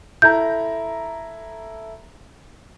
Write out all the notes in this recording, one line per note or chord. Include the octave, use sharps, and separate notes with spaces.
E4 A4 A#5 G6